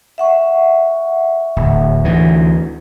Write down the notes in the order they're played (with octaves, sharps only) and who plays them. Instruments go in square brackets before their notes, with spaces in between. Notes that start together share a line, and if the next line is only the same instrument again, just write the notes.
[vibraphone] E5 F#5 C#6
[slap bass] D1
D2 E3